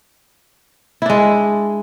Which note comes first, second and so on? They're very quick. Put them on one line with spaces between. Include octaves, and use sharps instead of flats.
E4 D4 G#3